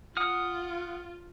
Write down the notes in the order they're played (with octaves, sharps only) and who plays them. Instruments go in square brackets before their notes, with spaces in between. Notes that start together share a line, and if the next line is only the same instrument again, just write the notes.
[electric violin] F4 [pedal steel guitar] F#5 D#6 F6